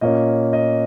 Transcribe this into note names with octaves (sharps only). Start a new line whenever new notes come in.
A#2 A#3 C#4 D#5
D#5